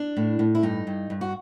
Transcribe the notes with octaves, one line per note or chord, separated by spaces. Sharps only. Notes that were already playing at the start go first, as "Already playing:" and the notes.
Already playing: D4
A2
A2
E4
G2 D#4
G2
G2
F#4